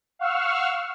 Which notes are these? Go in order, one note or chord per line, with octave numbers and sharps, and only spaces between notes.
F5 F#5 C#6 E6 F6